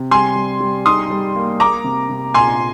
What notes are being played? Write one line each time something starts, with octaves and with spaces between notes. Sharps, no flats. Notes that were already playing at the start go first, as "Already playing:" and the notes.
Already playing: C3
G3 G#5 C6
G3
G3
D#4 C6 D#6
G3
A#3
A#3 A#5 D6
C3
C3
A#2 G#5 C6